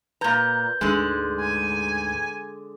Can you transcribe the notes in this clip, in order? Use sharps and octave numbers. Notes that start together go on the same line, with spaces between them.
A#2 B4 A#5 G6 G#6
D2 G#2 D3 G#3
G#5